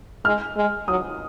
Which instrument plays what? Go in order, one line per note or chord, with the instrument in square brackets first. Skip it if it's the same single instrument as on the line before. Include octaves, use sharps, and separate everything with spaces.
[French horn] G#3 [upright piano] F6
[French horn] G#3
[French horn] F#3 [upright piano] D#6